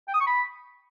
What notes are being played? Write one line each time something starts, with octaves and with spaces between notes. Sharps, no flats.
G5
D#6
C#6
B5